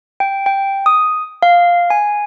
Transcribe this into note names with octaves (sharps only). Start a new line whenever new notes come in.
G5
G5
D#6
F5
G#5